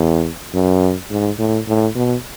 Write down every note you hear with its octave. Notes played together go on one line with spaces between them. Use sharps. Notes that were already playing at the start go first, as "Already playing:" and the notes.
Already playing: E2
F#2
G#2
A2
A2
B2